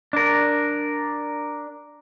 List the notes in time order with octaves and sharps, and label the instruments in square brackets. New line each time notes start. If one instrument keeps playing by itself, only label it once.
[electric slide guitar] D4 A#4